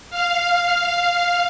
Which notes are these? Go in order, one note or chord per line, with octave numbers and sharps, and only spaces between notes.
F5